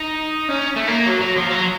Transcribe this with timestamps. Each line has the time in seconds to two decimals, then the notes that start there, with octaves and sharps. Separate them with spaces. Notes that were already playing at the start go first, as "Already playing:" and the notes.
Already playing: D#4
0.49 C#4
0.76 A3
0.88 A#3
1.06 F#3
1.21 F#3
1.37 F3
1.51 F#3